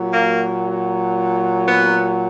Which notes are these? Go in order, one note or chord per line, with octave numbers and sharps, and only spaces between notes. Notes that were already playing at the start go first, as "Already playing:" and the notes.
Already playing: A#2 F#3
A#3
B3